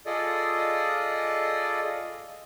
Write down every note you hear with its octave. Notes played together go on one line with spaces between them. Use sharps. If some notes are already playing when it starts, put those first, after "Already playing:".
F4 G#4 A4 D5 D#5